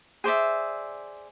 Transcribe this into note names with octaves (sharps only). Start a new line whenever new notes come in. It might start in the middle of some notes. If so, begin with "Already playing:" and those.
G#4 C5 D5 E5